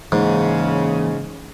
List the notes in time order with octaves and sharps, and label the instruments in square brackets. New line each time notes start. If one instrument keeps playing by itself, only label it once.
[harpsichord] G#2 [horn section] C#3 [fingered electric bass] E3 A#3